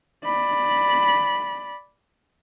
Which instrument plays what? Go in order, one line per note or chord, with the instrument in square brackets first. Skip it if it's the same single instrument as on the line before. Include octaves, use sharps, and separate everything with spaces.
[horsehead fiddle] D5 B5